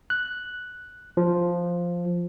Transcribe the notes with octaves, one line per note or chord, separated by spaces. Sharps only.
F#6
F3